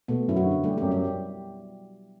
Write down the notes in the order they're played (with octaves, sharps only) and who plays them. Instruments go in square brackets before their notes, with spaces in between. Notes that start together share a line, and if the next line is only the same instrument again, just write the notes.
[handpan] B2 B3 [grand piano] A3
[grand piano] F#2 [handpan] E4
[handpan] F#3 F#4
[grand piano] D3
[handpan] G3 G4 [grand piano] A3
[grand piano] F#2 [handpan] G3 G4
[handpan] G3 G4